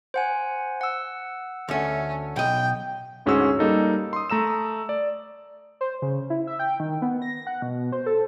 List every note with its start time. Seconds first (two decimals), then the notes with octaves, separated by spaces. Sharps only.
0.14 C5 F#5 G#5
0.81 F#5 E6
1.69 D2 A3 C#4
2.36 B1 D#5 G5
3.26 D2 G#2 C#4 F#4 G#4 E6
3.59 G3 A#3 D#4 A4
4.13 C6 D#6
4.30 A3 A#5 E6 E7
4.89 D5
5.81 C5
6.02 C#3
6.30 E4
6.47 E5
6.59 G5
6.80 D#3
7.02 B3
7.22 A#6
7.47 F#5
7.62 B2
7.92 C5
8.06 A4